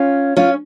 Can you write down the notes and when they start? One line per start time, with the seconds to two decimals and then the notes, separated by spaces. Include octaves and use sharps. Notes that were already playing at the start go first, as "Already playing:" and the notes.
Already playing: C#4 F4
0.36 C#4 F4